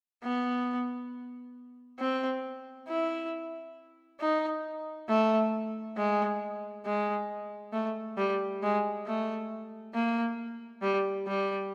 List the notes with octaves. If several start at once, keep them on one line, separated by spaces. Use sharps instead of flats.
B3
C4
E4
D#4
A3
G#3
G#3
A3
G3
G#3
A3
A#3
G3
G3